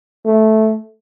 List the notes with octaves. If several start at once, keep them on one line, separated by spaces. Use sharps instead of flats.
A3